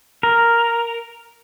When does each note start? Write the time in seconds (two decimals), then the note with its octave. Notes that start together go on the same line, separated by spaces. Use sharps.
0.23 A#4